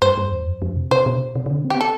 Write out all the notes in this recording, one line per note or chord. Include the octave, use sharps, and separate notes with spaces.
G2 C5
G2
E2
G2
F2
F2
C3
C3 C5
B2
C3
C3
D3
C4
G4
B3
A4